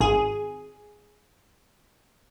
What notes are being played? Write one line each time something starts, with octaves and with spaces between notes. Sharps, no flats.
G#1 G#4